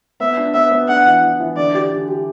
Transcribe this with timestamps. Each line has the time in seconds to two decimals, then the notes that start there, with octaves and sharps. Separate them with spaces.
0.20 B3 E5
0.37 D4
0.54 B3 E5
0.71 B3
0.88 D4 F#5
1.05 E3
1.23 E3
1.40 E3
1.57 D3 D5
1.74 G4
1.92 D3
2.08 G4